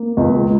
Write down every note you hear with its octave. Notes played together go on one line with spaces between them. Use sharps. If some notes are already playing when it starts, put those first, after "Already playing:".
Already playing: A#3
C#2